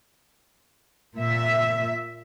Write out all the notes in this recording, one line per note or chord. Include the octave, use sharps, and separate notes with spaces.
A#2 E5